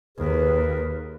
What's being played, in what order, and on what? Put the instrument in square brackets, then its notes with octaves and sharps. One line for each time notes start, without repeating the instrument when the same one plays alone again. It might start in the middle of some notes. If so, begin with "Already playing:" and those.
[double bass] D#2 [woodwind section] G#4 A#4 B4